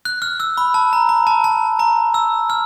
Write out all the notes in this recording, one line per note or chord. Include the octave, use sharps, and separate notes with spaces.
F#6
F6
E6
B5
A5
A#5
A#5
A5
A5
A#5
E6
F6